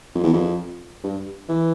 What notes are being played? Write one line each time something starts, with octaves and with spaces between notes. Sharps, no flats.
F2
E2
F2
G2
E3